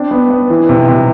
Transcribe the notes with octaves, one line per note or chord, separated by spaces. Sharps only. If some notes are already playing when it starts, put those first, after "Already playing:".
Already playing: C4 D4
B3
B3
E3
C3
C3